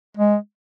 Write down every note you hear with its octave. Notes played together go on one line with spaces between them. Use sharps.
G#3